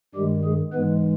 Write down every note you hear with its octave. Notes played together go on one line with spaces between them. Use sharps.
G2 D#3 G3 G#3 G4
G#3 G#4
G#2 E3 G#3 B3 B4